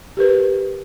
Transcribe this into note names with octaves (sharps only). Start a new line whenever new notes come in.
G4 A#4 B4